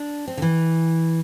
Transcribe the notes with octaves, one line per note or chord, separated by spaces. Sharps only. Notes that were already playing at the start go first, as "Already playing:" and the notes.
Already playing: D4
C4
D3
E3